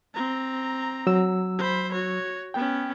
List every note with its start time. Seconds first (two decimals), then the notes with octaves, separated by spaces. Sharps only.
0.14 C4 A#5
1.07 F#3 E6
1.59 C5 B5
1.92 F#4 C#5
2.54 B3 C#4 G5